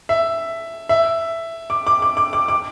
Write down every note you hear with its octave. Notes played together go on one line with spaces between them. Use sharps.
E5
E5
D6
D6
D6
D6
D6
D6